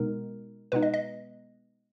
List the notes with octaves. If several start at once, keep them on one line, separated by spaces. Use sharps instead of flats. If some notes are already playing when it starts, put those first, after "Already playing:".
Already playing: B2 G#3 B3 D#4 A#4
B2 G#3 B3 D#4 B4
D#5
D#5